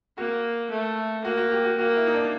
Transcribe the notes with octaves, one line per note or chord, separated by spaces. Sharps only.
A#3 F#4
A3
A#3 F#4
F#4
G4
F#4
A#3 F#4
E4
D#4
D4